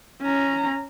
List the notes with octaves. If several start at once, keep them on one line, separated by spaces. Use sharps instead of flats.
C#4 A#5